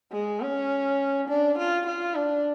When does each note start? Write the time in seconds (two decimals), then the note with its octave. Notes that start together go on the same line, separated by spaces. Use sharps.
0.12 G#3
0.41 C#4
1.28 D4
1.58 F4
1.87 F4
2.15 D4